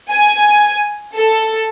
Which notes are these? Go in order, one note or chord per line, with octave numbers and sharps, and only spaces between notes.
G#5
A4